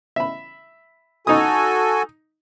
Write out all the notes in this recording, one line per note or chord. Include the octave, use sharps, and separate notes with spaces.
E5 B5
D#4 F#4 A4 G#5 D#6